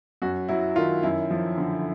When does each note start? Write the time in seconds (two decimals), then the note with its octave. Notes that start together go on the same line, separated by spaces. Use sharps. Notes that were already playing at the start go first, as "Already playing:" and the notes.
0.22 F#2 F#4
0.48 F#3 E4
0.76 D#3 F4
1.03 F#2 E4
1.31 F3
1.58 D3